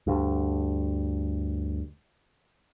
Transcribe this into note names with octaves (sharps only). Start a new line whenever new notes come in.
D2 G2